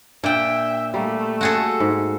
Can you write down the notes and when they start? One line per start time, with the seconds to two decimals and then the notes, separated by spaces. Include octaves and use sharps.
0.24 A#2 D4 E5 G5
0.94 G3 A3 A#3
1.41 F#4 G#4 A4
1.80 G#2